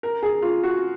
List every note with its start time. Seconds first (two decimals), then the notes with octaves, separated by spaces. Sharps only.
0.03 A#4
0.23 G#4
0.42 F4
0.63 F#4